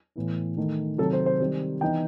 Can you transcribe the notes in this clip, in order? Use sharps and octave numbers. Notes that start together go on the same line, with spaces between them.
A2 E3 B3 E4
D#3 A3 D#4
C3 D#3 F#3 A4
C5
C5
D#3 G3 C4
E3 B3 D#4 G5